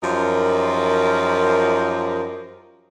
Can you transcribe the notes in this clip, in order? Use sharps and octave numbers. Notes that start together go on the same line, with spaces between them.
F#2 F3 D#4 G4 A#4 C5